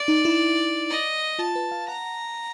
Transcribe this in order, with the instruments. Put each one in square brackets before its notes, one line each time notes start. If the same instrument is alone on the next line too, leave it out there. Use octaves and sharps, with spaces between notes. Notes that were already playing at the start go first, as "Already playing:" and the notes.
Already playing: [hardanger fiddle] D5
[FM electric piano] D#4
E4
[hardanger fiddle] D#5
[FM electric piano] F4 [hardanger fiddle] A5
[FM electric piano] B4
F5
[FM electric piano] F#5 [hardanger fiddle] A#5